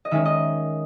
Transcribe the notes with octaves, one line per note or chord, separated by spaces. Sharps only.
D#5
D#3 G#3 C#4 E5
D#5